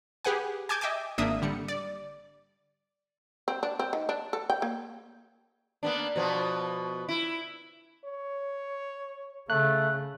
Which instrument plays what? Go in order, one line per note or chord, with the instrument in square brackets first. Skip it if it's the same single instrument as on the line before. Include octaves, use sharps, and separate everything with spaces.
[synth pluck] G4 G#4 B4 F#5 G#5
G#5 A5 D6 G6 G#6
D#5 E5 G5 G#5 D6
G#1 A#3 D4 E5 D#6
D3 G3 C#7
D5
[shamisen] C4
D4
C4
D#3
D4
A4
G5
A#3
[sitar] A#3 B3 D4
B2 F3 B3
E4
[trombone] C#5
[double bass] C#3 [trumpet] A3 [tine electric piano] F#6